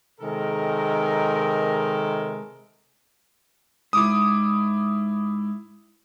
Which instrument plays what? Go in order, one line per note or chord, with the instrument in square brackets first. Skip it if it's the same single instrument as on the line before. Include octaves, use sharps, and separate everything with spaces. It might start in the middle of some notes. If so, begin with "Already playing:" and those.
[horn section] C3 D#3 G#3 A4 A#4
[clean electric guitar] G#2 [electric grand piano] E4 D6 D#6